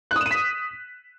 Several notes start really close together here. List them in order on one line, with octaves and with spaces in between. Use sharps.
F#6 D#6 E7 D#7 B6